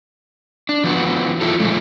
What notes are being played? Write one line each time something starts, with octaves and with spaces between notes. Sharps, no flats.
D4
E3 F3 B3 F#4 B4
E4 F4 A4
A#2 F3 G#3 A3